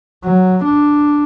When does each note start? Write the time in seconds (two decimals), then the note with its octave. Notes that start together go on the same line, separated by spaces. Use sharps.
0.24 F#3
0.65 D4